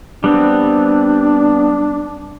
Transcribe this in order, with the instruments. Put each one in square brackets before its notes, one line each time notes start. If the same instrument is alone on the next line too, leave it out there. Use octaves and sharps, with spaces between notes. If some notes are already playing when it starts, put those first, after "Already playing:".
[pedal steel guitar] G3 B3 C4 [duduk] D4